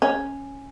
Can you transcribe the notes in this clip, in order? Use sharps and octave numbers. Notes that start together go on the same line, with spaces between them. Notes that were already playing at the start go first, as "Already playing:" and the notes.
C#4